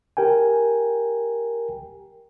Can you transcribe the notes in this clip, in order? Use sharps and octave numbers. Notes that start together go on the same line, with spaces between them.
G4 A#4 G5 G#5